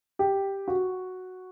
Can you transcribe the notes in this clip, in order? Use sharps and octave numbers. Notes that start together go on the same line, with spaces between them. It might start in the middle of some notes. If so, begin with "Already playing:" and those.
G4
F#4